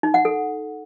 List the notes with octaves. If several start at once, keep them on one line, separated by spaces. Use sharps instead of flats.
D#4
F#5
A4